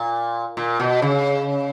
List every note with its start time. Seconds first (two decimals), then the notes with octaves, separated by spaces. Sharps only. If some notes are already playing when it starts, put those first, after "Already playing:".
Already playing: A#2
0.57 A#2
0.80 B2
1.02 C#3